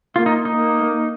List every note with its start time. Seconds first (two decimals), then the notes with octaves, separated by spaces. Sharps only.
0.16 A#3 F4
0.26 D#4
0.45 D#4
0.56 A#3